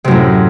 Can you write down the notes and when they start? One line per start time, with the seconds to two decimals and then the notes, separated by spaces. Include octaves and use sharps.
0.04 C3
0.08 F#2
0.11 A2